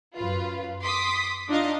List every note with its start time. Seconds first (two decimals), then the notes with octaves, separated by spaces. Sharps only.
0.15 F#2 F4 B4
0.83 C6 D6 D#6 B6
1.48 D4 D#4 F4 D#5 F5